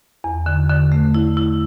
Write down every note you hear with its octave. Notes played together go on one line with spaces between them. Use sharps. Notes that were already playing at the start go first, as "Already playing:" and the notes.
E2
D3
D3
A3
E4
E4